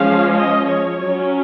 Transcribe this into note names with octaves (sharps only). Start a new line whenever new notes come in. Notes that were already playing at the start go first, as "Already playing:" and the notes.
Already playing: F3 G#3 C#4 F5
D#5
C#5
F#3 C#4